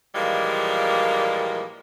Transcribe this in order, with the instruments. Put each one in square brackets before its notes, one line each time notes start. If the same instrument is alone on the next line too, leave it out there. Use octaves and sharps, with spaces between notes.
[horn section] A#2 E3 F3 G3 G#3 A#3